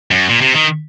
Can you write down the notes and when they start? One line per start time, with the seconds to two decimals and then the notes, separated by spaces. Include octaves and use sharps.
0.11 F#2
0.29 A#2
0.41 C3
0.55 D#3